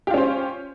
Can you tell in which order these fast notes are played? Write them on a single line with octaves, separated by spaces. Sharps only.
G4 F4 C#4 C5